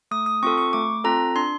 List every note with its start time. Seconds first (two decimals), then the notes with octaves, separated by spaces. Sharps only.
0.11 A3 D#6
0.26 D#6
0.43 C4 F4 A4 C#6
0.58 C#6
0.73 A3 D6
1.04 C4 F4 A4 A#5
1.36 D4 C6